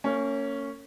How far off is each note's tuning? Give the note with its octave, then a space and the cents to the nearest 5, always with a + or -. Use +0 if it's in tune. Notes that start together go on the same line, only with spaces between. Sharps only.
A#3 -35 C#4 +0